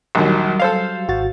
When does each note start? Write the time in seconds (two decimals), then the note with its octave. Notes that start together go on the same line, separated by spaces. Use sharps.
0.15 A#1 D#2 F#3 G3
0.60 A4 C5 F5
1.08 G#1 F#4 A6